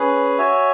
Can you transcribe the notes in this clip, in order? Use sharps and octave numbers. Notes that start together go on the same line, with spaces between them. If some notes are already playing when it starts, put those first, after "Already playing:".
Already playing: C#4 G#4 B4
F#4 C#5 E5 G#5